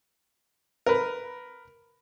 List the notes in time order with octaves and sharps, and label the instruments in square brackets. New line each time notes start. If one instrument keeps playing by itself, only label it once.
[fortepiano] A#4 B4